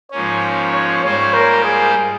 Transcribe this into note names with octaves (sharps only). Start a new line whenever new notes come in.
G#2 F3 A#3 C#4 C#5
C#5
G#2 G3 A#3 F4 C5 C#5
A#4
G#4